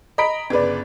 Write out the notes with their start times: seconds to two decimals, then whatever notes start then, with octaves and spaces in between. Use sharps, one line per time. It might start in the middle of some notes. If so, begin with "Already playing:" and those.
0.18 D#5 A#5 B5 B6 D7
0.50 G1 C#3 B4 D5